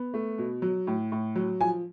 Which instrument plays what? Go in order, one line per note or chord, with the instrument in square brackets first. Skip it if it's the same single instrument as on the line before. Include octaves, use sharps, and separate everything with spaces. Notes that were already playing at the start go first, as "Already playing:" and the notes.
Already playing: [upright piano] B3
A3
B2
F#3
A2
A2
F#3
F3 G#5